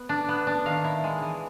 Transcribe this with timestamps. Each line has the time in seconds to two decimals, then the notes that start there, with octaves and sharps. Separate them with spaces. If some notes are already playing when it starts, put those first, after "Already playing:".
Already playing: B3
0.09 D4
0.29 B3
0.47 D4
0.66 D#3 F5
0.84 E4
1.04 G#3
1.22 E3